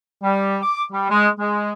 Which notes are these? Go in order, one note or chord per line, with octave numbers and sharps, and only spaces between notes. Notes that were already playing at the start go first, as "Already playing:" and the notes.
G3
D6
G3
G#3
G#3